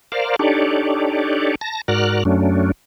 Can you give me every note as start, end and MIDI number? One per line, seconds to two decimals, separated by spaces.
0.12 0.36 70
0.12 0.36 72
0.12 0.36 74
0.12 0.36 77
0.39 1.55 62
0.39 1.55 63
0.39 1.55 67
0.39 1.55 69
0.39 1.55 73
0.39 1.55 74
1.61 1.81 81
1.61 1.81 94
1.88 2.23 44
1.88 2.23 66
1.88 2.23 70
1.88 2.23 74
1.88 2.23 89
1.88 2.23 90
2.25 2.72 42
2.25 2.72 54
2.25 2.72 57
2.25 2.72 61
2.25 2.72 62